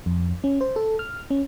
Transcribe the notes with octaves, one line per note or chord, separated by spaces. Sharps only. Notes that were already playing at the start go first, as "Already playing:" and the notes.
F2
C#4
C5
A4
F6
C#4